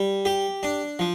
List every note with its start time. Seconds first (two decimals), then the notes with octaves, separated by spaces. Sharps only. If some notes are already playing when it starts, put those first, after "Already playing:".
Already playing: G3
0.25 G4
0.63 D4
0.99 F3